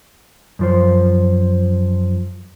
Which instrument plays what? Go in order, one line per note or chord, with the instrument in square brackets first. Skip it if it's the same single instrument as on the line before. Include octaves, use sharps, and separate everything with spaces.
[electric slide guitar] F#2 F3 C5